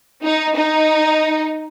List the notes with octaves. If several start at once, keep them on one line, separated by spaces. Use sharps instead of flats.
D#4
D#4